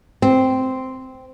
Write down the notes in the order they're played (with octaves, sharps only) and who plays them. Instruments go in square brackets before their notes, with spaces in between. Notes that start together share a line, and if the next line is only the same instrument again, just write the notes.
[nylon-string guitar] C4